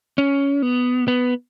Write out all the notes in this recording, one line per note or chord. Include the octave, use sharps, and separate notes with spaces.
C#4
B3
B3